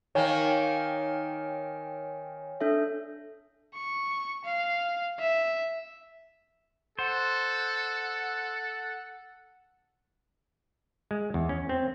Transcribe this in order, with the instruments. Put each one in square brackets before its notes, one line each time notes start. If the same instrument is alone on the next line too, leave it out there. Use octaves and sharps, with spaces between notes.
[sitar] D#3 A#3 [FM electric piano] C#5 G5 G#5
[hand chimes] D4 A4 E5
[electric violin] C#6
F5
E5
[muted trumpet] A4 [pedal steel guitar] C5 [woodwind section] F#5
[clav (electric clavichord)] G#3
E2
C#4
C4